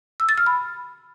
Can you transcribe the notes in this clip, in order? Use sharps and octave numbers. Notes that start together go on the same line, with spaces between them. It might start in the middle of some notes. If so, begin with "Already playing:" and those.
E6
A6
F6
B5